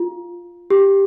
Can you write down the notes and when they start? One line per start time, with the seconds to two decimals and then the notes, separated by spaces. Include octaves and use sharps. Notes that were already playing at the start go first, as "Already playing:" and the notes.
Already playing: F4
0.70 G4